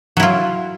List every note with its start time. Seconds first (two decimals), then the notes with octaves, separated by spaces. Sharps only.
0.17 F#3
0.20 E4
0.23 F4